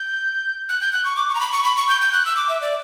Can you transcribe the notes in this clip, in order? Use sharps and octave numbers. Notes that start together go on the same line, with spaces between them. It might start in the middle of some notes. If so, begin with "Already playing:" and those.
Already playing: G6
F#6
G6
F#6
C#6
D6
C#6
A#5
B5
C#6
B5
C#6
G6
G6
F#6
E6
D6
E5
D5